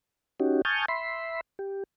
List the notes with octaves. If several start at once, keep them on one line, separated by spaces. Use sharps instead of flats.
C#4 D#4 F#4 G4
G#5 A5 C#6 D#6 F6 G6
E5 B5 C6
G4